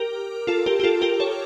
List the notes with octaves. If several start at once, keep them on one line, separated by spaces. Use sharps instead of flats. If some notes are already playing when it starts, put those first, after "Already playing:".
Already playing: G4 A#4
F4 A4
G4 A#4
G4
F4 A4
G4 A#4
A4 C#5